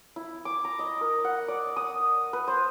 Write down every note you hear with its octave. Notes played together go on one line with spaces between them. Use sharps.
E4
D6
A#5
D#5
A#4
F#5
D5
D#6
B4
C5